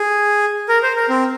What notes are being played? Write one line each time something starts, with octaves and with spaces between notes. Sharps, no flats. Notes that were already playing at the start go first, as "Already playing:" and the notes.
Already playing: G#4
A#4
C5
A#4
C4